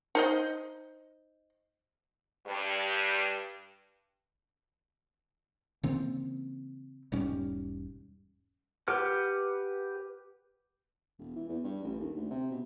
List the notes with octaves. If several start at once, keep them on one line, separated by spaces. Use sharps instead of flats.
D#4 C5 D#5
G2
C#3 E3 A#3 C4
E1 G#2 G3 C#4
G4 B4 F#5 F6
E1
E3
E2
G2
A1
D#2
D2
C3
B2